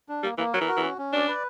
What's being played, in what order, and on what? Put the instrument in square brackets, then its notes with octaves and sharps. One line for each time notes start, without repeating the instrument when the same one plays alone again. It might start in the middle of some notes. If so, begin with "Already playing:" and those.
[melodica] D4
[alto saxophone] G3 [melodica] A#3
[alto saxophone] E3 [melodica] A#3
[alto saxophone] F#3 [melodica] A#4
[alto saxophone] E3
[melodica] F#4
[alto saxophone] E3
[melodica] C#4
C#4
[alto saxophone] D4 [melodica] D5
[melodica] B4